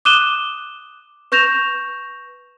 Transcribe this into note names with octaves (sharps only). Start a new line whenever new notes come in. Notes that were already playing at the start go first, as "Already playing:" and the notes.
D6 D#6 F#6 D#7 E7 G7
B4 C#6 G6 A#6 E7 F7